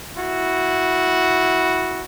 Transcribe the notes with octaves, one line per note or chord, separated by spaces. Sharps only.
E4 F#4